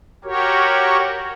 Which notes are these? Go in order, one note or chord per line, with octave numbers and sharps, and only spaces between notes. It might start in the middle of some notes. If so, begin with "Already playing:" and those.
F#4 G4 A#4 C#5